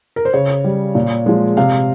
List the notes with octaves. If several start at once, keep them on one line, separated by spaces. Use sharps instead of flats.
A#4
C5
C#3 C#5
G3
A#2
F3 G#3
C3 F5